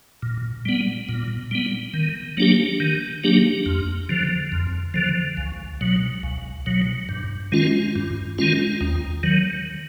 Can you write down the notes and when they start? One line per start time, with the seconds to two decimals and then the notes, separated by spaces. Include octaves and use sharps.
0.22 A#2
0.65 G3 B3
1.09 A#2
1.51 G3 B3
1.94 D#3
2.37 F#3 A#3 D4 G4
2.80 D#3
3.24 F#3 A#3 D4 G4
3.66 F2
4.09 D3 F3
4.52 F2
4.94 D3 F3
5.37 C#2
5.81 B2 F#3
6.23 C#2
6.66 B2 F#3
7.09 G2
7.52 D#3 G#3 C#4 F4
7.96 G2
8.38 D#3 G#3 C#4 F4
8.81 D#2
9.23 D#3 F#3